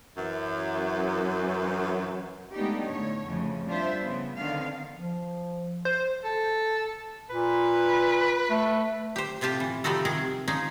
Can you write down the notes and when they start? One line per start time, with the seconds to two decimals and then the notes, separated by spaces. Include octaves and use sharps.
0.18 F#2 E3
2.54 G#3 A3 B3 D4 D#4 G4
2.87 A2 D3 C#5
3.25 F2 A2 C#3 F3
3.67 G3 D4 F4 C5 E5
4.01 C#3 B3
4.37 D3 D#3 B3 C4 F5
4.94 F3
5.85 C5
6.24 A4
7.30 A#2 B4
8.50 A3
9.16 G4 C5
9.41 A2 C3 F4 G4 A5
9.60 E3
9.84 C3 F3 G3 D#4 F#4 A4
10.05 C3 D#3 G#4 A#4
10.48 F3 C#4 D#4 G#4